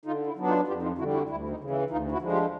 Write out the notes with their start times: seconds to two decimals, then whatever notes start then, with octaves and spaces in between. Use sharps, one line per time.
0.05 D3 D#4 F4
0.26 E4
0.36 F#3 B3 D4
0.47 D#4 F4
0.67 F2 F4 G4
0.82 D#4 F4
0.98 D3 G3 E4 F#4
1.13 E4 F#4
1.29 D2 E4
1.49 D#4
1.60 C#3 E3
1.70 E4
1.90 D2 D#4 F4
2.11 E4 F#4
2.21 D3 F3 G#3
2.31 F4 G4